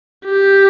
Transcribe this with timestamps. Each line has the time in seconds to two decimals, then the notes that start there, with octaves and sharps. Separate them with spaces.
0.25 G4